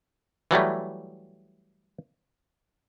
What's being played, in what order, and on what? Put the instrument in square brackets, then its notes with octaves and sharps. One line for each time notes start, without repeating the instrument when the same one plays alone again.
[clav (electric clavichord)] E3 F#3 G3 A3